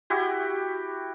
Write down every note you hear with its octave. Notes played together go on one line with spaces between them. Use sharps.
E4 F#4 G4